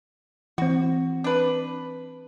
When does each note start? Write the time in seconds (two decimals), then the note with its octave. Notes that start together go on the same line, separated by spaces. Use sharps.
0.58 E3 C4 F#4
1.24 D4 B4